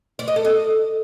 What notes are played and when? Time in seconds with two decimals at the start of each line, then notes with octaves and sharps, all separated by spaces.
0.19 D5
0.28 D#5
0.36 A4
0.45 D#5